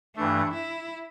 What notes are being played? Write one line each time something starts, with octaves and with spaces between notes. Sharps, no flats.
G2 E3 A3 D4
E4